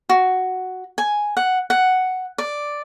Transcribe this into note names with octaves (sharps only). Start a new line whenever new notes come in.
F#4
G#5
F#5
F#5
D5